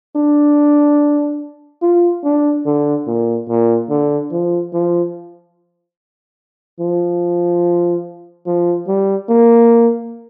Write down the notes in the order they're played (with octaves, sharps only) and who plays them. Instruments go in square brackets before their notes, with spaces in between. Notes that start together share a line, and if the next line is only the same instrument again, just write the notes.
[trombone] D4
F4
D4
D3
A#2
A#2
D3
F3
F3
F3
F3
G3
A#3